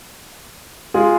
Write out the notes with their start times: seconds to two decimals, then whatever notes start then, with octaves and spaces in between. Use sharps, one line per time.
0.94 G#3 F4 G#4